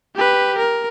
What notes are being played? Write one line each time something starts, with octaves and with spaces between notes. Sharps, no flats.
G4 B4
A#4